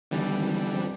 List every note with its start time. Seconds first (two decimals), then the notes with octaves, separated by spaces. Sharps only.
0.11 B1 D3 E3 G3
0.37 G#1
0.55 E2
0.72 F2